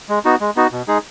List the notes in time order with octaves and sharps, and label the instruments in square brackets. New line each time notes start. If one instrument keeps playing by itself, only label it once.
[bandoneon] G#3
B3 D#4 F#4
G#3
B3 D#4 F#4
B2
G#3 D#4 G#4